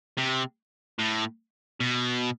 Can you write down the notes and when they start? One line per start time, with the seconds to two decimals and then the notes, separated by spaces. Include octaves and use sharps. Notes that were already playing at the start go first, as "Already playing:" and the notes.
0.18 C3
0.99 A2
1.80 B2